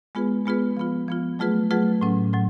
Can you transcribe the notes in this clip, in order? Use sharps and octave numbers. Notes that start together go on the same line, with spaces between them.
G#3 B3 F4 G#4 B4
G#3 B3 F4 G#4 B4
F3 B3 F4
F3 B3 F4
F#3 A3 F4 G#4 B4
F#3 A3 F4 G#4 B4
A2 F#3 C#4
A2 F#3